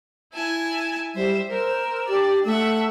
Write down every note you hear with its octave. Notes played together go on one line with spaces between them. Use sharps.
E4 G#5 A5
G3 C5 E5
A#4 C5 E6
D4 G4 D5
A3 E5 F#5